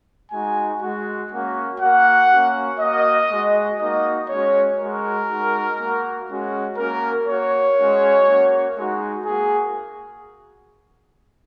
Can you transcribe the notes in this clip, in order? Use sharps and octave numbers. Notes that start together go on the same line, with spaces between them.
G#3 D#4 F#4 G#5
G#3 F#4
A#3 C#4 F#4
A#3 F#4 F#5
A#3 C#4 F#4
A#3 F#4 D#5
G#3 F#4
A#3 D#4 F#4 D#5
G#3 C#4 F#4 C#5
G#3 F#4 A#4
G#3 D#4 F#4
A#3 F#4
G#3 C#4 F#4
A#3 C#4 F#4 A#4
A#3 F#4 C#5
G#3 C#4 F#4
A#3 C#4 F#4
G#3 D#4 F#4
A#3 F#4 G#4